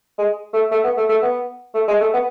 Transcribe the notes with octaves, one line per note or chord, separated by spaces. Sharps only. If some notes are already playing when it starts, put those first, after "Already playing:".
G#3
A3
A3
B3
A3
A3
B3
A3
G#3
A3
B3